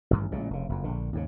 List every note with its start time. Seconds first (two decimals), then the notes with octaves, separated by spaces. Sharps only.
0.11 A1 G2 D#3
0.31 A1 A#2 C#3 G#3
0.50 F1 C#3
0.69 F#1 F2
0.84 A#1 D3
1.13 D#2 G#2 C#3